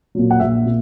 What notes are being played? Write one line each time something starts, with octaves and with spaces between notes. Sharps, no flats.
A#2 F#3
F#5
A#1 E5
A#2